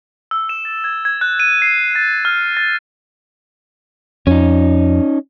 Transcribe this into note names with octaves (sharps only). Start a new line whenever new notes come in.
E6
E7
A6
G#6
G#6
F#6
D#7
C7
A6
F6
A6
F2 C#4 D#4